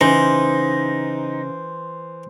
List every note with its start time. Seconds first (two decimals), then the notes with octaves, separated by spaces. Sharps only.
0.01 C#3 E3 D#4 C5